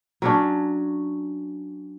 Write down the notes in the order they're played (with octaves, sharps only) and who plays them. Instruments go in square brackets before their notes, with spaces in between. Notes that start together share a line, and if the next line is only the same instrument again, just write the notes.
[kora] F#3 C#4 D4